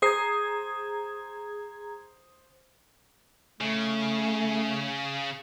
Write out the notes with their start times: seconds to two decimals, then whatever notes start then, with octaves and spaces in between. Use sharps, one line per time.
0.02 G#4 C5 A#5 D#6 G#6 C7
3.61 C#3 A3